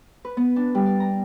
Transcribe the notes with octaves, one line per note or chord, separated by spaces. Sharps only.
B4
B3
D4
G3
D5
A#5